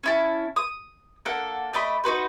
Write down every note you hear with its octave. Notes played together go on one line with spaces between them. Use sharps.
C#4 E4 A5
D#6
A#3 D4 A4 F#5
A3 D5 D#5 B5
D#4 F#4 B4 C5